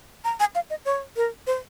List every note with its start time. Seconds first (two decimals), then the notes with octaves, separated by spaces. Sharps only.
0.24 A#5
0.40 G#5
0.55 F5
0.70 D#5
0.85 C#5
1.16 A#4
1.47 C5